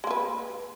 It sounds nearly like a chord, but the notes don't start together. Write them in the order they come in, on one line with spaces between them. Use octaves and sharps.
G#3 A#3 B4